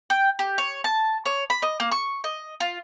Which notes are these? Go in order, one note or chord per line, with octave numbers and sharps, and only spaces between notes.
G5
G4
C#5
A5
C#5
B5
D#5
A#3
C#6
D#5
F4